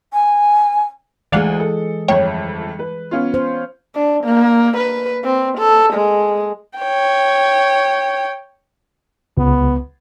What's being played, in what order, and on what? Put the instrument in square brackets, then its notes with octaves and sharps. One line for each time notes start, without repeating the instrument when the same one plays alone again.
[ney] G#5
[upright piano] D2 [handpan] E3 G#3 G#4 [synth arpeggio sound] D5 F5 F#5
[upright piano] A4
[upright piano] G1 F2 [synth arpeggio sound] C#5 G5
[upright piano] B4
B3 C#4 F4
[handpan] C5
[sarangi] D4
A#3
B4
C4
A4
G#3
[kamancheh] C#5 G5
[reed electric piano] C#2 [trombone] B3